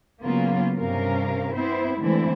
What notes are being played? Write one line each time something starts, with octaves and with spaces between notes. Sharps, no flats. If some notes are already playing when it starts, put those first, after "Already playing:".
C#3 F#3 A#3 B3 F4
G2 C3 C#4 A#4 F5
B3 C4 E4 C5
D3 E3 G#3 A3 C4 E4